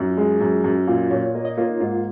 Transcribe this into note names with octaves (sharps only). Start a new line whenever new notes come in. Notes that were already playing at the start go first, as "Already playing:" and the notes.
Already playing: F#2 D#4
F4
G#3
F#2
F#2
A#2 F4
A#2 C#5
A#3 D#5
D#5
A#3 F4
D#4
G#2 F4